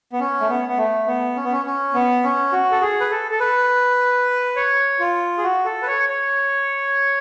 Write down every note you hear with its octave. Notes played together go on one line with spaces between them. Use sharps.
B3
C#4
A3
B3
B3
A3
B3
C#4
B3
C#4
C#4
B3
C#4
F#4
A4
G#4
B4
A4
A4
B4
C#5
F4
G#4
F#4
A4
B4
C#5
C#5